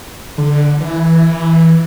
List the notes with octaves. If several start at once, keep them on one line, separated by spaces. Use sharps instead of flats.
D3
E3